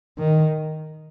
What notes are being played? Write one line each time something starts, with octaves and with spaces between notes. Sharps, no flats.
D#3